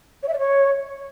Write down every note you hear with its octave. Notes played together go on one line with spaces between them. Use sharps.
C#5
E5
D5
C#5